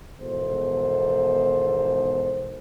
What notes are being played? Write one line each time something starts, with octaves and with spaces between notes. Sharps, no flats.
E2 G#2 B2 D#3 A4 C5